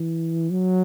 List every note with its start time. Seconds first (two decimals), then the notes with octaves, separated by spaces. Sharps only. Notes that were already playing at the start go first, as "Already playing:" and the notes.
Already playing: E3
0.51 F#3